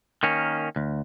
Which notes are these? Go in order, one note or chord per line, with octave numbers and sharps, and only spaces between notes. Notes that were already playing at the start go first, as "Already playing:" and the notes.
D#3 A#3 C#4
D2